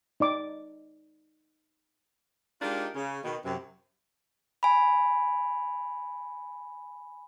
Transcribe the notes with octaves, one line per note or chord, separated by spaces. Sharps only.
D#4 D5 D6
G#3 D4 D#4 F4 G4 A#4
C#3
B2 D#3
F#2 C3
G#5 B5